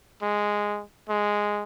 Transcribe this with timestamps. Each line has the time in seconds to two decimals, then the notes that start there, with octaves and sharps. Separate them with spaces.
0.22 G#3
1.09 G#3